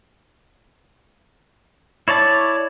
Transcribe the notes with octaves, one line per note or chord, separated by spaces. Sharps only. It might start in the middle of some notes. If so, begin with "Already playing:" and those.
E4 C#5 D5 A5